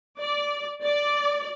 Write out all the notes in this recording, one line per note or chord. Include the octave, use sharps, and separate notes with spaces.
D5
D5